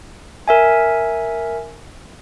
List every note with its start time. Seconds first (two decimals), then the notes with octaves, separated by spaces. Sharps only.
0.48 A#4 E5 G#5